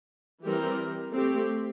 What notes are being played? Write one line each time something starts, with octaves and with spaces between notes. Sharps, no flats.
E3 G3 C4 G4 A#4
A3 C4 G4